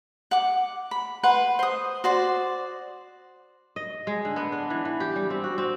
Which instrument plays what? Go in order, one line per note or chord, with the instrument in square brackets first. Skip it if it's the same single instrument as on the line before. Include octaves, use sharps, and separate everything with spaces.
[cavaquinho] F#5 D6
B5
B4 F#5 C6
C5 D#6
F#4 C5 D5
[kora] D#5
G#3
D3
B3
D4
E3
E3
G4
G3
C4
F#4
C4